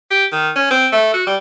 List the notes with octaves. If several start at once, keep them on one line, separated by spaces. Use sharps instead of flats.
G4
D#3
C#4
C4
A3
F#4
G3